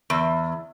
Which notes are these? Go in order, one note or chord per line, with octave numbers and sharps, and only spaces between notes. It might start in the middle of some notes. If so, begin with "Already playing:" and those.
E2